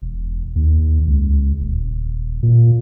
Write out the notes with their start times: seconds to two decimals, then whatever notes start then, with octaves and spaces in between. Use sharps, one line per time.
0.02 E1
0.56 D#2
1.07 C#2
1.60 D#1
2.43 A#2